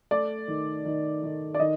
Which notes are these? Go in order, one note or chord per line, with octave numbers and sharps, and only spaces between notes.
A3 D5
D#3
D#3
D#3
D5
D#3 D#5